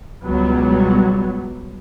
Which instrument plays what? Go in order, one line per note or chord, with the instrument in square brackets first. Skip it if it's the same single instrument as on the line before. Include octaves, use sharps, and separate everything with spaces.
[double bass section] C#2 B2 F#3 G3 B3